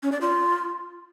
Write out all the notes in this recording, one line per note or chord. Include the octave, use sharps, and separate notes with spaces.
C#4
D5
F4